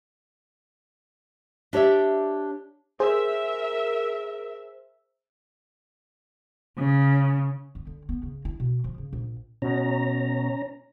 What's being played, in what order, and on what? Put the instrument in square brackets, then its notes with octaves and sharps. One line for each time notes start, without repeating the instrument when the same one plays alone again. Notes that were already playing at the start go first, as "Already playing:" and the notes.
[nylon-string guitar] D4 G4 C#5 D5 E5
[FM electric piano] G#4 C5 [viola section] A#4 E5
[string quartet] C#3
[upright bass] B3
D3
B3
C#3
E4
B2
F3
C#3
A#1
[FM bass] B2 [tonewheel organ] C#4 A#5